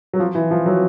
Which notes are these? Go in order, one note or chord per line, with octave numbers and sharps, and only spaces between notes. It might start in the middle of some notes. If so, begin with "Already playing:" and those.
F#3
F3
E3
F3
F#3